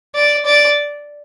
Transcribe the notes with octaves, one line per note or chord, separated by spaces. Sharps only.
D5
D5